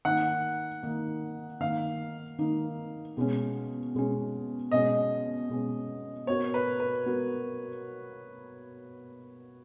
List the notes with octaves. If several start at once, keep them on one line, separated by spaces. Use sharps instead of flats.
D#3 A#3 D#4 F#5
D#3 A#3 D#4
D#3 A#3 D#4 F5
D#3 A#3 D#4
B2 G#3 C#4
B2 G#3 C#4
B2 G#3 C#4 D#5
B2 G#3 C#4
B3 F#4 A#4 C#5
B4
B4
B3 F#4 A#4